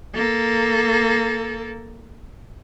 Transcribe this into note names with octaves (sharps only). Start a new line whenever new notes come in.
A#3 A4